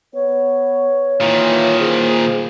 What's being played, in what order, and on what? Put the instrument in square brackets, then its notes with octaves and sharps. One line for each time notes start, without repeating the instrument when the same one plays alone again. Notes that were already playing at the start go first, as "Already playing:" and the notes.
[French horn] B3 [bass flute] C#5
[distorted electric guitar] A#2 D#3 [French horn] E3
[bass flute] G#4 [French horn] C5